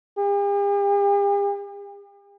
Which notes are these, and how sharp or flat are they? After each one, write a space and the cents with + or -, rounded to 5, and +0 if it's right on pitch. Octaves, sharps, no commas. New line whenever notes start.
G4 +45